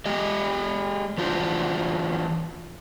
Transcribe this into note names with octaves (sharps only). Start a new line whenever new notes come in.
G#3 G4 D#5
E3 D4 F4 F#4 B4 C5